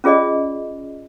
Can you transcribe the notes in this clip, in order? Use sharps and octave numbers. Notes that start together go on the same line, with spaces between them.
C#4 F4 G#4 D5 D#5